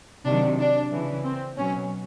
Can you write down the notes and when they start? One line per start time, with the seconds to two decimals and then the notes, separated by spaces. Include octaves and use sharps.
0.25 C3 D#3 F#3 D4
0.59 D4
0.91 C#3 E3
1.24 C4
1.57 B2 F#3 C#4